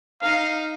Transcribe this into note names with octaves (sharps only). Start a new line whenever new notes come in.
D#4 F5